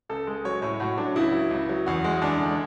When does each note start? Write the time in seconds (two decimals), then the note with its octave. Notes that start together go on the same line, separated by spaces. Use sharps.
0.09 C#2 A4
0.27 G#3
0.45 F#3 C#5
0.62 A2 C#5
0.80 A2 F#4
0.98 F#3 D4
1.16 C#2 E4
1.33 F#3
1.51 C#2
1.69 F#3
1.86 E2 F#4
2.04 G#3
2.22 E2 D4
2.39 D3